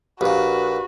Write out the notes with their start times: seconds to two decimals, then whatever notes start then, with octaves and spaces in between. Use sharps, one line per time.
0.21 A#1 A#2 F#4 G4 B4